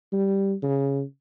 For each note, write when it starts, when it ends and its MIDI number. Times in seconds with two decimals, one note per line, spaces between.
0.12 0.54 55
0.63 1.03 49